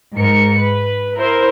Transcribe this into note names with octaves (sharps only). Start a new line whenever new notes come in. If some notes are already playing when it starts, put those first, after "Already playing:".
G#2 A#4 C#7
B4
E4 A#4 C5